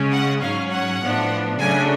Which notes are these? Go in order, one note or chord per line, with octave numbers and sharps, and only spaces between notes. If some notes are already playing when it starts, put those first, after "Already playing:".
Already playing: C#3 G#3 C#4
F#5
G#2 F#3 C#4 F5
F#5
A2 F3 B3 D4
C#3 F#3 A3 D4 G#5